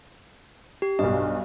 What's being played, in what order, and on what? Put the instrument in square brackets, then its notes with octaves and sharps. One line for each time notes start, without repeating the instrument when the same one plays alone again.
[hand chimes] G4
[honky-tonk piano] B1 G2 [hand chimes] D#5